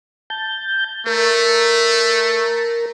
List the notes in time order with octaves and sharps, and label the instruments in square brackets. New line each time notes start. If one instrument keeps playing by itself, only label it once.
[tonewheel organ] A5 G6
[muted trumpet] A3 [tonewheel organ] A#4